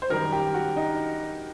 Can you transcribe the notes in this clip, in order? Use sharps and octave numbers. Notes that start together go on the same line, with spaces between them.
C5
F#2 D#3 G3 A#4
G4
F#4
D#4